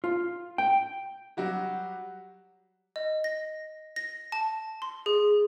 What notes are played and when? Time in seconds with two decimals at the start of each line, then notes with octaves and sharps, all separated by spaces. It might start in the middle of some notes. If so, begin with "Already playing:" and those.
0.04 F4
0.58 G5
1.37 F#3 G3 F#4 G4
2.96 D#5
3.24 A#6
3.96 A#6
4.32 A5
4.82 C6
5.06 G#4